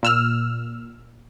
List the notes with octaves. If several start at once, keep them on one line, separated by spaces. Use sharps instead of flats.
A#2 E6 F6